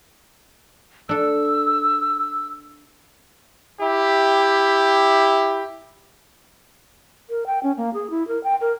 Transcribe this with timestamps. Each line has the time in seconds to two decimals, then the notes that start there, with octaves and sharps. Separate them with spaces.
1.09 D4 A4 E6
3.81 E4 G4
7.30 A#4
7.46 G5
7.63 C#4
7.77 A#3
7.94 G#4
8.10 E4
8.28 A#4
8.44 G5
8.61 A#4